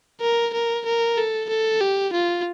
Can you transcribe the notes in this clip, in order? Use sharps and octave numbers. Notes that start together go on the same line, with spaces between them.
A#4
A#4
A#4
A4
A4
G4
F4